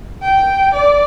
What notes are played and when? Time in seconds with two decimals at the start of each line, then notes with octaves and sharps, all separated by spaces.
0.22 G5
0.74 D5